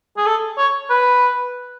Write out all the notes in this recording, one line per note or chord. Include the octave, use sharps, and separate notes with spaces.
G#4
A4
C#5
B4